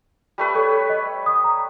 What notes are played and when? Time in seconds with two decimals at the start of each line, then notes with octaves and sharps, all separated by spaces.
0.38 G3 A3 B4
0.55 A4 C#5
0.90 D#5
1.26 D#6
1.44 A#5